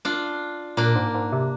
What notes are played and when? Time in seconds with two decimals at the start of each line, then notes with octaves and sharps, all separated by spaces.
0.05 D4 F4
0.77 A#2 A#3 D4
0.96 G#2
1.15 G#2
1.32 C3